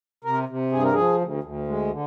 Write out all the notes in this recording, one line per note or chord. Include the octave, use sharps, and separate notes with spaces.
C3 A#4
C3
G2 G#4
A#4
F3 G#4
D2
D2
G#3
D3